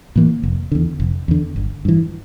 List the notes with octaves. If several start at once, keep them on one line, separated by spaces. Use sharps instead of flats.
A2 E3 A#3
F1
E2 D3
F1
E2 D3
G1
G2 E3